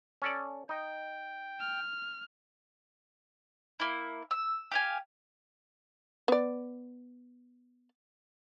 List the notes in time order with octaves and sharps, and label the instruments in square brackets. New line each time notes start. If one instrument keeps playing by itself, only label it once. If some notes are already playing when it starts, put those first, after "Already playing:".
[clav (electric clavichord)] C#4 A4 D5
[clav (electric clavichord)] D#4 D#5 [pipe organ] G5
[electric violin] F6
[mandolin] A#3 E4
E6
G4 F5 G#5
[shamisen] B3 D5